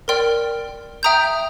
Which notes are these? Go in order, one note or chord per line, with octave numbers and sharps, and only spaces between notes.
A#4 D5 G5 C6 F6
E5 G5 A#5 D#6 G6